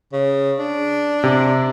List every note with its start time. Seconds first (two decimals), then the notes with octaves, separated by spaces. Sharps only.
0.12 C#3
0.59 D4
1.24 C3